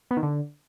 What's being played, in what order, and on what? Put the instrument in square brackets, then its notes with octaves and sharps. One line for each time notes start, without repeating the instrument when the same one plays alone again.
[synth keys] B3
D#3
D3